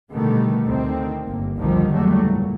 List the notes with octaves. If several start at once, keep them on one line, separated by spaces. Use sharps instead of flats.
B2 D3 D#3 G3 A3 B3
D2 D3 D#3 C4
G1 A#3
C2 F2 D3 D#3 F3 G3
F#1 E2 F#3 G3 A3
A#2